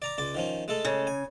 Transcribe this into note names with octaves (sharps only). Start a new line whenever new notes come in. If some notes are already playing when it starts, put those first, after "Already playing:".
D5 A#5 D6
C#2 D5 D6
D#3 F3 C#4
G#3 A3 A4
C#3
G#5